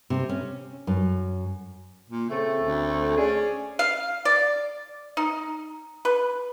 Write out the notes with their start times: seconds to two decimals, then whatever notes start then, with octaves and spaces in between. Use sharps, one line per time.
0.10 C3
0.29 C#4
0.87 F#2
2.10 A#2
2.30 C#3 A3 C4
2.61 D2
3.18 C#4 G#4 D5
3.79 F5
4.25 D5
5.17 D#4
6.05 B4